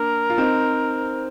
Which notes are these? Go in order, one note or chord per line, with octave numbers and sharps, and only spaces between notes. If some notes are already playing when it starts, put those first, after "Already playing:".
Already playing: A#3 D4 A#4
F4
C4 D#4